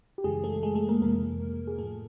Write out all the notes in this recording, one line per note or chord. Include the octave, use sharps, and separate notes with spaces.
G4
F#2 C#3 E3 G#3 G#4
A3 A4
G#3 G#4
A3 A4
A#3 A#4
F2 C3 E3 A#3 A#4
G#4
A2 F3 G#3 A3 A4